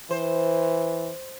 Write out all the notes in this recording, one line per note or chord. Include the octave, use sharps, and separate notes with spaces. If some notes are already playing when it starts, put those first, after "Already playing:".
E3 C5